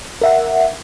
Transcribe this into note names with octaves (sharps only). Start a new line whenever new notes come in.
A#4 E5 F#5